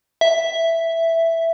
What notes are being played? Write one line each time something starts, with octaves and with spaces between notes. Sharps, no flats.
E5